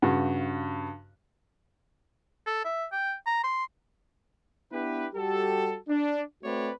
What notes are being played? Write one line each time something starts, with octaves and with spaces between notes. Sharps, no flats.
G2 C#3 F#4
A4
E5
G5
A#5
C6
B3 D4 E4 G4 B4
G3 F#4 G4 A4
D4
A3 C4 F#4 B4 C#5 D5